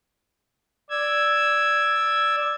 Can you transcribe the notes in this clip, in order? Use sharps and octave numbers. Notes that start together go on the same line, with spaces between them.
D5 E6 G#6